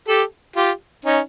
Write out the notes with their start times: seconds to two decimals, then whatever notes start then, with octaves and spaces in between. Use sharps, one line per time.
0.08 G4 A4
0.56 F4 G4
1.05 C#4 D#4